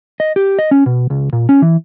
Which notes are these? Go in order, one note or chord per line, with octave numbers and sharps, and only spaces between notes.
D#5
G4
D#5
C#4
B2
C#2
A#2
C#4
E3